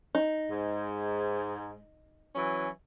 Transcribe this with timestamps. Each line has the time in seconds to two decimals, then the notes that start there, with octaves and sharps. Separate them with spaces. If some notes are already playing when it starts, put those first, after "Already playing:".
0.15 D#4
0.50 G#2
2.35 E3 F#3 C#4